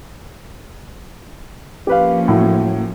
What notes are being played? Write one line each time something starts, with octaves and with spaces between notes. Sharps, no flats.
F3 A#3 C#4 G4 B4 F5
A2 F#3